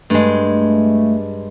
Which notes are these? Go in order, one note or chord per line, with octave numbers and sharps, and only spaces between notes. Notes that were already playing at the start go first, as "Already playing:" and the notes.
G2 G#3 A3